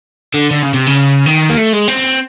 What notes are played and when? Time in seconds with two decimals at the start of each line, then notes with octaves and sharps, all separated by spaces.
0.34 D3
0.51 D3
0.62 C#3
0.74 C3
0.86 C#3
1.26 D#3
1.49 A#3
1.57 A3
1.73 G#3
1.88 C4